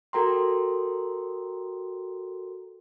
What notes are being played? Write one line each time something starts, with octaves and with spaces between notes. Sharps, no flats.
F#4 A4 A#4 G5 A#5 C6